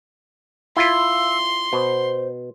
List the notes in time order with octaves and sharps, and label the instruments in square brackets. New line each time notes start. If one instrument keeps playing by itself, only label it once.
[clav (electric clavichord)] E4 F4 [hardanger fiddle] C6 [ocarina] E6
[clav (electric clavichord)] B2 [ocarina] C5